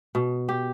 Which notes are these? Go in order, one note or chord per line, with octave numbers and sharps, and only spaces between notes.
B2
G4